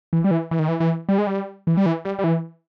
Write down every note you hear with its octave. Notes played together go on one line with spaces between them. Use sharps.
E3
G3
E3
E3
D#3
E3
E3
G3
G#3
G3
E3
G3
E3
G3
G3
E3